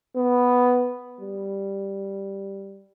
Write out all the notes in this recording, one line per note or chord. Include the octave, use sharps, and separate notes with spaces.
B3
G3